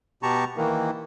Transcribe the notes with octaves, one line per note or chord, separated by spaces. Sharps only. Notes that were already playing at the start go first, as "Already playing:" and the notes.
B2 G4 A5 A#5 C#6
D#3 E3 A#3